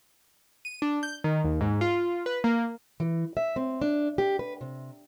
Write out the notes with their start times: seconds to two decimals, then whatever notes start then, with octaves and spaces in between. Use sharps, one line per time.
0.65 D#7
0.82 D4
1.03 G6
1.24 D#3
1.44 D#2
1.61 G#2
1.81 F4
2.26 B4
2.44 A#3
3.00 E3
3.37 E5
3.56 C4
3.82 D4
4.18 G4
4.39 B4
4.61 C3